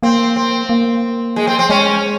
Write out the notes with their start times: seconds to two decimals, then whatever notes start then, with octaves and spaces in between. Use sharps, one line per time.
0.03 A#3 C4
0.36 C4
0.69 A#3
1.36 G#3
1.47 C4
1.59 C4
1.70 G#3 C#4